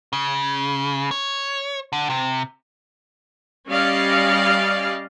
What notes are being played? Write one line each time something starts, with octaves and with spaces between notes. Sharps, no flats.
C#3
C#5
D3
C3
G3 C#4 D5 D#5 F5